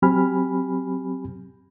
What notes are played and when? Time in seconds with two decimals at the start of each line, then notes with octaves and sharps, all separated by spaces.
0.02 F#3 C4 G4 G#5 B5 F6